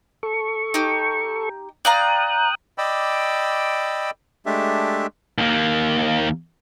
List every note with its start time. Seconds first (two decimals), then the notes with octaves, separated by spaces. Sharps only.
0.23 A4 C#6
0.74 D#4 G4
1.85 D5 F5 G5 A#5 D#6 F#6
2.78 D5 D#5 G5 B5 D6 E6
4.46 G#3 A3 D4 G4 E5
5.38 D#2 A#3